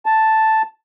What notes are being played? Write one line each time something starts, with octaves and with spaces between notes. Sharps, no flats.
A5